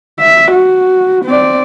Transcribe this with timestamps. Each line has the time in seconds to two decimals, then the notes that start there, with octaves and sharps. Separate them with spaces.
0.20 E5
0.52 F#4
1.25 C4 D5